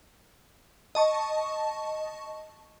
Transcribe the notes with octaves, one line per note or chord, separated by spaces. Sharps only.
D#5 A5 C#6